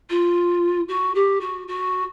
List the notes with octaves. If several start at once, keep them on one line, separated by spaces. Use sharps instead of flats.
F4
F#4
G4
F#4
F#4